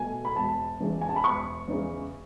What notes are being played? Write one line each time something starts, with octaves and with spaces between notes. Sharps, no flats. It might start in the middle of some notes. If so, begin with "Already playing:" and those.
Already playing: B2 A3 G#5
B5
E1 A5
E2 C#3 E3 G#3
G#5
A5
B5
E1 C#6
E2 C#3 E3 G#3